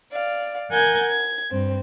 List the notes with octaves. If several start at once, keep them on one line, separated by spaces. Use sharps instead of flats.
D5 F5
A#4 F#5 G#5 G6 G#6
G#6
G2 C4